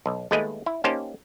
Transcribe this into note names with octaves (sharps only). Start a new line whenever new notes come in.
B1
D#2 G#3 A3 B4 D#5 G#5
E4
A#3 C#4 D#4 G4 C5 A5